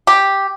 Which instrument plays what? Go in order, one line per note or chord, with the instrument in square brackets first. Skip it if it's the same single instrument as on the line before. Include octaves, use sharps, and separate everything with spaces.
[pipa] G4